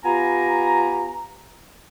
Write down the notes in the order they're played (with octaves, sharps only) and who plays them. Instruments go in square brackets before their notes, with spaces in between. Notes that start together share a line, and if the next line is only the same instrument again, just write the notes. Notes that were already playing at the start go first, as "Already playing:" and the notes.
[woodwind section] B3 F4 G4 G#5 A#5